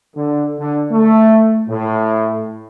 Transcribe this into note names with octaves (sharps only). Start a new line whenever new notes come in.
D3
D3
A3
A2